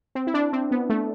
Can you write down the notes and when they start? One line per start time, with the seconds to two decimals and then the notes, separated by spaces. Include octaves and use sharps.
0.15 C4
0.27 E4
0.34 D4
0.53 C4
0.71 B3
0.90 A3